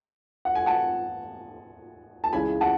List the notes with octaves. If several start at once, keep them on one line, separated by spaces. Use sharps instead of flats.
F#5
G#5
F#5 A5
A5
C#2 C#3 E3 G#3 G#5 B5
F#5 A5